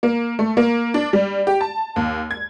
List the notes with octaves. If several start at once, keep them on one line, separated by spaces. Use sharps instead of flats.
A#3
A3
A#3
D4
G3
G4
A5
D#2
G#6